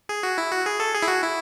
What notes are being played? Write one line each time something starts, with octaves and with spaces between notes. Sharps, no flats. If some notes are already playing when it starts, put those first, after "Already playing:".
G#4
F#4
E4
F#4
G#4
A4
G#4
E4
F#4
E4